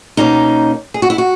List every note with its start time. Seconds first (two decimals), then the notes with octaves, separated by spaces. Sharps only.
0.17 B2 A#3 C#4 D#4
0.94 G#4
1.02 F#4
1.10 E4
1.18 F#4